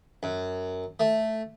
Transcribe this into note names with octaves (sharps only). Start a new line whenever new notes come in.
F#2
A3